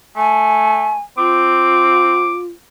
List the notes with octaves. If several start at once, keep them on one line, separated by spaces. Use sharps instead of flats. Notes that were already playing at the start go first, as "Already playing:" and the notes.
A3 G#5
C4 F4 D6